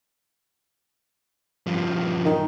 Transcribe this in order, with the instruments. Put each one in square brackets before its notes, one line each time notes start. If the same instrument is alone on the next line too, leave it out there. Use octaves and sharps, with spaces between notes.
[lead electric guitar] G2 F3
[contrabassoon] D#3